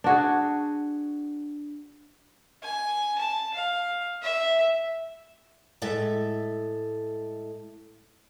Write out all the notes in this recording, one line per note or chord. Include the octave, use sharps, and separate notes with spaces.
D4 F#4 G#4
G#5
A5
F5
E5
A2 G#3 A4 E5